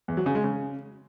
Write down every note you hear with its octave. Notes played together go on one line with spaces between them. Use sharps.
E2
F#3
C#3
G#3
C#3